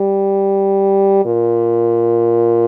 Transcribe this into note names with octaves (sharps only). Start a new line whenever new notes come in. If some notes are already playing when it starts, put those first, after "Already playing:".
Already playing: G3
A#2